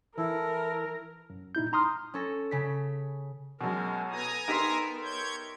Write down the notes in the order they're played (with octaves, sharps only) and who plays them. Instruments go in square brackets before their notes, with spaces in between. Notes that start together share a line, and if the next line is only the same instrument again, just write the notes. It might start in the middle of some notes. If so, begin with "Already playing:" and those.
[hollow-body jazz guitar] E3 [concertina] E4 A4 [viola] A#4
[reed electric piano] F#2
A#2 D#4 E4 G6
A#5 C6 D#6 F6
[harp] C#4 A4 A#6
C#3 B6
[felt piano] F#2 B2 [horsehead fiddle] G#3 A#4
[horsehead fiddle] B3 A4 [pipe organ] G#5 A#5 D#6
[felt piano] D#4 G4 [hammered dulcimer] A#4 E5 C6
[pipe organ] C#5 G6 G#6